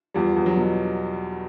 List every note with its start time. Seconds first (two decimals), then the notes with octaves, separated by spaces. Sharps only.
0.14 E2 F3 G3
0.36 E2
0.46 F#3
0.57 B2